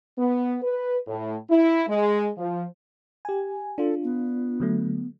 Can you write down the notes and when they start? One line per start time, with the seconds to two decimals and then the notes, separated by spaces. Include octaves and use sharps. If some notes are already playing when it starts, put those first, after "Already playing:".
0.18 B3
0.63 B4
1.07 A2
1.50 E4
1.88 G#3
2.38 F3
3.25 G4 G#5
3.78 D4 F4 A4
4.04 B3
4.60 D3 F#3 A3